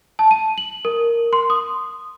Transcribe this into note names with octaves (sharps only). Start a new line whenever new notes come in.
A5
D#7
F#7
A#4
C6
D#6